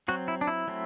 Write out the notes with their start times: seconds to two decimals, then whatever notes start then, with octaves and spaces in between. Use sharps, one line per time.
0.08 F#3 C4 F#4
0.28 E4
0.41 D4
0.47 E4
0.68 F#3 A3 C4